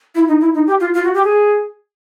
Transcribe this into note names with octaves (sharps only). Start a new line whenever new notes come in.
E4
D#4
E4
D#4
G4
F4
F4
F#4
G4
G#4